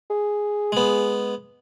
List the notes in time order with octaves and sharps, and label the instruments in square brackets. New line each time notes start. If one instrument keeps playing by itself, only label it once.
[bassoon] G#4
[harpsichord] G#3 B3